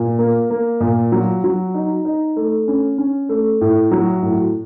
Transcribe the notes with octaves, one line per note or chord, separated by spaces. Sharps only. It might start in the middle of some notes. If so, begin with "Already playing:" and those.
Already playing: A#2
A#3
A#3
A#2
F#3
F#3
D#4
D#4
A3
C#4
C#4
A3
A2
F#3
A2